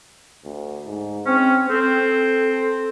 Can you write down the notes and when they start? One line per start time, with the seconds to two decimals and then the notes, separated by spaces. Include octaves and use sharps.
0.44 D2
0.86 G#2
1.26 C4 C#4
1.70 C4 A4